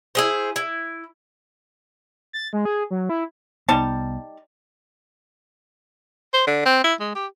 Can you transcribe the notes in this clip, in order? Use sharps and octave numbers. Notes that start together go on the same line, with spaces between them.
E4 G#4 C5
E4
A6
G#3
G#4
F#3
E4
C2 G3 B3 D#4 A5
C5
D3
C4
E4
G#3
G4